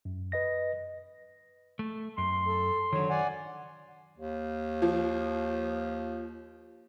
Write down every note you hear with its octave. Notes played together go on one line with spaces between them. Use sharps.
F#2
B4 D#5 A#6
A3
F#2 C6
A4
D3 D#3 F#3 C#5
D5 F#5 G#5
D#2
F3